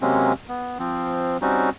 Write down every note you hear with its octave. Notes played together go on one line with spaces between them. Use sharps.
C3 F#3 G#3 A#3 C4 C#4
B3
F3 C4
G3 C4 C#4 D#4 F#4